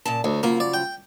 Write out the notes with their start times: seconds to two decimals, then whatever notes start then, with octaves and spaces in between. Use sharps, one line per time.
0.05 A#2 C#3 A5
0.24 D2 C#5
0.43 C#3 F3 F#3 A#3
0.60 D5
0.74 G5